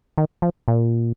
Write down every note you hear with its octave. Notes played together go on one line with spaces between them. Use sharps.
D#3
F3
A#2